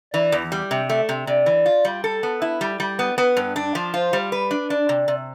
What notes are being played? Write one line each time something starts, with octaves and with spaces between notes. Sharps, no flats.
E3 D5
E2
G3
C3
A3 E5
C3
C3 D5
E3
F4
G3
A4
B3
E4
G3
G3
B3
B3 B4
G2
D4
F3
F4 C5
G3
B4
D4
D4 D5
C3
C3